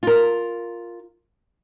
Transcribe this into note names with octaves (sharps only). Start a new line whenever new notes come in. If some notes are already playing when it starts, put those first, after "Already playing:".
F4 A#4